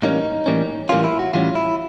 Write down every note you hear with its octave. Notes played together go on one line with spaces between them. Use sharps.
A2 E3 G3 A#3 C#4 D#4
A2 E3 G3 A#3 C#4
A2 E3 G3 A#3 C#4 F4
E4
F#4
A2 E3 G3 A#3 C#4 F4
E4